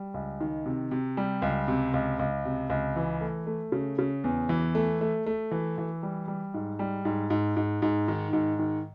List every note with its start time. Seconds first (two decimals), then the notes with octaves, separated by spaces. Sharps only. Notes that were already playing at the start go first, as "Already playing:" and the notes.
Already playing: G3
0.14 C#2
0.41 D#3
0.66 C3
0.91 C3
1.17 G3
1.42 C#2
1.68 C3
1.94 C#2
2.19 C#2
2.45 C3
2.70 C#2
2.96 E3
3.21 A3
3.47 A3
3.72 C#3
3.98 C#3
4.24 E2
4.49 E3
4.75 A3
5.01 A3
5.26 A3
5.51 E3
5.78 E3
6.03 G3
6.28 G3
6.54 G#2
6.79 G3
7.05 G#2
7.30 G#2
7.57 G#2
7.82 G#2
8.08 D#3
8.33 G#2
8.59 D#3